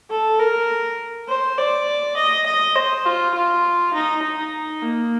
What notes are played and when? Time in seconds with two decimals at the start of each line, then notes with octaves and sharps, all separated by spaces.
0.10 A4
0.40 A#4
1.28 C5
1.58 D5
2.17 D#5
2.46 D#5
2.75 C5
3.06 F4
3.35 F4
3.94 D#4
4.23 D#4
4.82 A#3